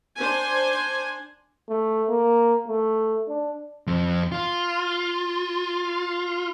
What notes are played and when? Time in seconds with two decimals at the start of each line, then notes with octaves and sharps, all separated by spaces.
0.16 D4 C5 G#5
1.69 A3
2.09 A#3
2.68 A3
3.29 D4
3.87 F2
4.32 F4